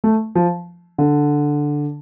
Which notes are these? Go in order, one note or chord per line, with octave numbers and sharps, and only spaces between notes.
A3
F3
D3